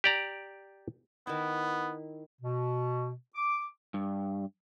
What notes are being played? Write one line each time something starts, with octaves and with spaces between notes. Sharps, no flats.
G4 D5 A#5
D#3 B3 E4
B2
D6
G2